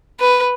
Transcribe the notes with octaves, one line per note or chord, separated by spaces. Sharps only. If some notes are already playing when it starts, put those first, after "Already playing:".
B4